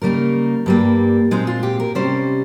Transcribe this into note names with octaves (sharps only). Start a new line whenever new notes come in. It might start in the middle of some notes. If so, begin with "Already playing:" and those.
C#3 G3 A#3 D#4 A#4
G2 G3 A#3
A#2 G#3 C4 D#4
F4
G4
A#4
C3 G3 C#4 C5